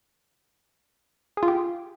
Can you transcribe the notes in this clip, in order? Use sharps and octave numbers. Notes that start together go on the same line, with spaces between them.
G#4
F4
G4